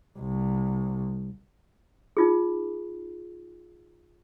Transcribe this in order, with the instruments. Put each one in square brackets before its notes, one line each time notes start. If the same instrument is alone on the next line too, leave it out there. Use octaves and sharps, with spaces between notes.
[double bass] C2
[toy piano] D#4 F4 G#4